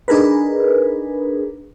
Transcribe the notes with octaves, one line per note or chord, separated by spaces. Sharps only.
D4 D#4 G#4 A#4 B4